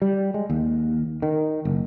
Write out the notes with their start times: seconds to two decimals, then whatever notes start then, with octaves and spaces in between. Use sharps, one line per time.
0.02 G3
0.34 G#3
0.49 D#2
1.22 D#3
1.65 F#1